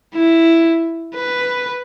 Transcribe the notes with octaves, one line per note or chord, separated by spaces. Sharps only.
E4
B4